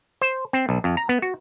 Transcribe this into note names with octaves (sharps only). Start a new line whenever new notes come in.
C5
C4
B1
F2
A#5
B3
F#4